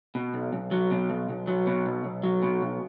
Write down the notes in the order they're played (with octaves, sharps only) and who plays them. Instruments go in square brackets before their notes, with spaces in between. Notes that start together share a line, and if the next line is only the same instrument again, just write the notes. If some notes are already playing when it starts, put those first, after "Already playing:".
[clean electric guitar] B2
B1
B1
F#3
B2
B1
B1
F#3
B2
B1
B1
F#3
B2
B1